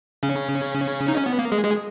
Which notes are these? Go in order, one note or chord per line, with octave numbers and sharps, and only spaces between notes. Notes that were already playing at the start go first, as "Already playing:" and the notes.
C#3 C#4
D#4
C#4
B3
A#3
G#3 G#4
G#3 G#4